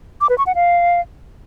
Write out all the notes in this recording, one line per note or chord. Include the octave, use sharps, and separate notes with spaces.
D6
B4
C#6
F#5
F5